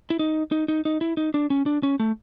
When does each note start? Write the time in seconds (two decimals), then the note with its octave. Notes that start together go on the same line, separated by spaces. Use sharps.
0.10 E4
0.19 D#4
0.52 D#4
0.68 D#4
0.85 D#4
1.01 E4
1.17 D#4
1.34 D4
1.50 C#4
1.66 D4
1.83 C#4
2.00 A3